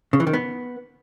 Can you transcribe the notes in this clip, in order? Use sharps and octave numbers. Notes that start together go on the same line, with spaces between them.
C#3
E3
D#3
B3